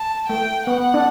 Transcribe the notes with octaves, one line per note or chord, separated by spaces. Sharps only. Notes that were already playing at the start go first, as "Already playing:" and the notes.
Already playing: A5
A3 G5
B3 F#5
D4